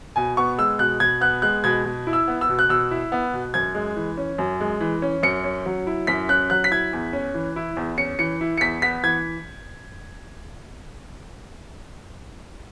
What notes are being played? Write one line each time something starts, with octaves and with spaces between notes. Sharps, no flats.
B2 G#5
B3 C#6
G#3 E6
B2 F#6
B2 G#6
B3 F#6
G#3 F#6
B2 G#6
B2
E4
E6
B3
E6
B2
F#6
B2 E6
E4
B3
B2
F#2 G#6
G#3
E3
C#4
F#2
G#3
E3
C#4
F#2 C#7
C#4
F#3
E4
F#2 B6
C#4 F#6
F#3 F#6
B6
E4 G#6
E2
C#4
E3
E4
E2
C#4 C#7
E3 C#7
E4
C#7
E2 B6
B3 B6
E3 G#6